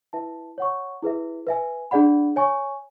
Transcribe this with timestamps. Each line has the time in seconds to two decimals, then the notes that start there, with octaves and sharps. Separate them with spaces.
0.13 E4 B4 E5 A5
0.58 C#5 F#5 C#6
1.02 E4 G#4 B4 E5
1.47 B4 E5 G#5
1.91 D4 G#4 D5 F#5 B5
2.36 C#5 G#5 C#6